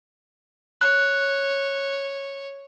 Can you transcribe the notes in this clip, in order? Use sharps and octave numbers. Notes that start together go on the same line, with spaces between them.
C#5 F#6